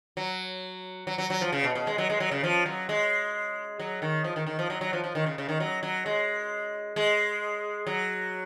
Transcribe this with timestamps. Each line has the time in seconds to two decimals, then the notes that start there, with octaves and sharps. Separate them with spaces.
0.17 F#3
1.07 F#3
1.18 F#3
1.30 F#3
1.41 F3
1.52 C#3
1.64 B2
1.75 B2
1.87 G#3
1.98 F#3
2.10 G#3
2.20 F#3
2.31 C#3
2.44 F3
2.66 F#3
2.89 G#3
3.80 F#3
4.02 D#3
4.24 F3
4.36 D#3
4.47 D#3
4.59 F3
4.70 F#3
4.81 F#3
4.93 F3
5.04 F3
5.15 D#3
5.26 C#3
5.38 C#3
5.49 D#3
5.60 F#3
5.83 F#3
6.06 G#3
6.96 G#3
7.87 F#3